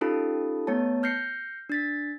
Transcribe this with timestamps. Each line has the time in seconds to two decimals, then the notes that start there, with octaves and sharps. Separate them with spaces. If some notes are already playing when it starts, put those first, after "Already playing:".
0.01 C#4 D#4 F4 G4 A4 A5
0.67 A3 B3 C#5 A5
1.03 F6 G6 A#6 C7 C#7
1.69 D4 A6 B6